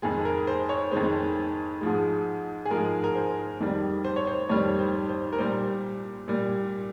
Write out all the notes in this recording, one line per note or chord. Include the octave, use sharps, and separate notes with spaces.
F2 D#3 G#3 G#4
A#4
C5
C#5
F2 D#3 G#3 C5
G#2 F3 G#3
G#4
G#2 F3 G#3 A#4
A#4
C5
F2 D#3 G3
C5
C#5
C5
F2 D#3 G3 C#5
C5
C5
A#4
A#2 G3 C5
A#2 G3